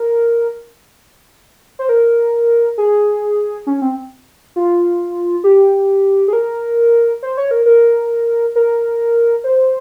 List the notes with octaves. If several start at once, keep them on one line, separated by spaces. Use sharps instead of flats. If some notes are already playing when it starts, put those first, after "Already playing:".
Already playing: A#4
C5
A#4
G#4
C#4
C4
F4
G4
G#4
A#4
C5
C#5
A#4
A#4
A#4
C5